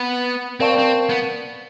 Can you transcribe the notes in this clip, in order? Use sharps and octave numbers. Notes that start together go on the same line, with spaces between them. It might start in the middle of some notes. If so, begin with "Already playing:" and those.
Already playing: B3
C4 A#4 D5 F5 A5 C#6
C4
B3